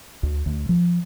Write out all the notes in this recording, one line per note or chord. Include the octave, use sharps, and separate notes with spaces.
D2
D2
F3